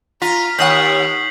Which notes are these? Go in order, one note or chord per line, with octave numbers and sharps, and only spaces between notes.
F4 A#5 B6
D#2 C#5 F#5 D#6 G6 B6 C7 F#7